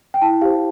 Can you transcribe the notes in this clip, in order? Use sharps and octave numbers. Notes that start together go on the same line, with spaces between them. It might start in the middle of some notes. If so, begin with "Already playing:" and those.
G5
E4 A5
G4 C5 F5